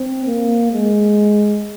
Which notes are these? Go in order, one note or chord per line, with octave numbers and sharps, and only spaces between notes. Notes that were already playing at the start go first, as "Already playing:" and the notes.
Already playing: C4
A#3
G#3